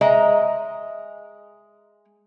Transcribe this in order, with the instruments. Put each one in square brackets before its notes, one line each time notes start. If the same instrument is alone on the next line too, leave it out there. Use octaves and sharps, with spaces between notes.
[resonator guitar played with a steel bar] G#3 D#5 E5 A#5